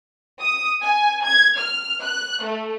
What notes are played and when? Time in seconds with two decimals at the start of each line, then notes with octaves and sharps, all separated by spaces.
0.40 D#6
0.82 G#5
1.24 G#6
1.57 F6
2.03 F#6
2.43 A3